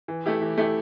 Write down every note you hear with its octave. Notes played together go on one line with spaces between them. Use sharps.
E3
A3 E4 G4
E3
A3 E4 G4